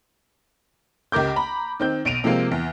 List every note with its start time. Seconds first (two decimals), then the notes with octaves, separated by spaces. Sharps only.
1.12 C#2 G4 A#4 D6 G6
1.36 A#5 B5
1.80 D#3 C4 G6
2.05 B1 D7 D#7 F7
2.24 C3 F3 G#3 A#3 C4
2.52 E2